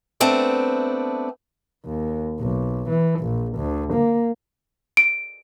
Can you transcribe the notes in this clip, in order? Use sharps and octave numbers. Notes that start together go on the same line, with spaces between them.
A3 B3 C4 D4
D#2
B1
E3
A#1
D2
A#3
D7